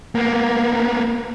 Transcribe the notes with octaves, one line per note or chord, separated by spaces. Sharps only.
A#3 B3